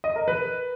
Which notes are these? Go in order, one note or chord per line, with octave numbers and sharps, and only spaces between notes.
D#5
A#4
B4